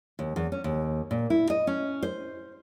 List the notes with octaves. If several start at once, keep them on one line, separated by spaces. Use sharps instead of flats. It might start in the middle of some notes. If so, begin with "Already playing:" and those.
D#2
E2
C#4
D#2
A#2
E4
D#5
C#4
C5